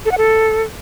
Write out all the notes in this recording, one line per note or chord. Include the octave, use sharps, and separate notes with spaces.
A4
F#5
A4